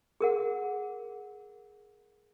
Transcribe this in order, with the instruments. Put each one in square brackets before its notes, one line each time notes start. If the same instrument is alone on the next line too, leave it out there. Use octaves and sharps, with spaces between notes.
[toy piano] G#4 A#4 F#5